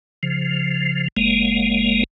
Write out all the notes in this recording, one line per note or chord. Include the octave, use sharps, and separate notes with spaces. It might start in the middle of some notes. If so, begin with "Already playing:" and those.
C#3 F3
F#1 G#3 A#3